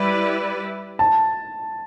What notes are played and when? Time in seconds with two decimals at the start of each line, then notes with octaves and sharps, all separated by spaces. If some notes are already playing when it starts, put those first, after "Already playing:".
Already playing: G3 E4 B4 D5
0.99 A5